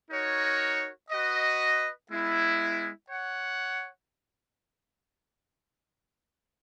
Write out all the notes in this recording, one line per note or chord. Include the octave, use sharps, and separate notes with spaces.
D#4 F#4 A#4 C#5
F#4 B4 D#5
G#3 B3 E4
C#5 F#5